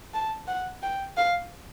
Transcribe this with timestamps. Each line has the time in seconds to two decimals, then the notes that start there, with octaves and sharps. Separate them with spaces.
0.14 A5
0.48 F#5
0.83 G5
1.17 F5